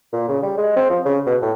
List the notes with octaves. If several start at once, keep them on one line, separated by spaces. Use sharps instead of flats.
A#2
C#3
G3
G#3
C4
F3
C#3
B2
A2